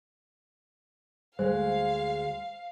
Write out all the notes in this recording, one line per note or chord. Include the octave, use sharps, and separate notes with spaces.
D2 G#3 C5 F5